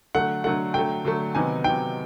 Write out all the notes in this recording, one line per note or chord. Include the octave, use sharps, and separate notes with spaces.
D3 F#3 A3 F#5
D3 F#3 A3 F#5
D3 F#3 A3 G5
D3 F#3 A3
C3 D#3 F#3 B3 D#4 G#5
C3 D#3 F#3 B3 D#4 G5